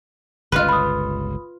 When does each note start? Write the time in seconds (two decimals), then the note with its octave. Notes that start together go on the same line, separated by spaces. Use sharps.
0.52 G1 C#2 F4 B4
0.69 B5 D#6